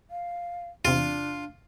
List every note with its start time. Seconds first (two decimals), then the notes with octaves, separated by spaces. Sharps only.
0.11 F5
0.85 E2 C3 D4 F4